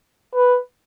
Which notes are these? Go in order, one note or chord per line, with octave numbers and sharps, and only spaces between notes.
B4